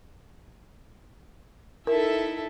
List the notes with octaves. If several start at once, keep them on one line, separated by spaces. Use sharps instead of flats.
D#4 E4 A4 A#4 E5